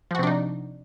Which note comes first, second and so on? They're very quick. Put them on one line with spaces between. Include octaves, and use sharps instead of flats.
F3 F#4 C3 D4 D#4